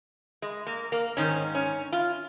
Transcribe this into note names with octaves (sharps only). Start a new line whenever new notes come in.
G#3
A#3
A#3
G#2 D#3 C#4
C#4
F4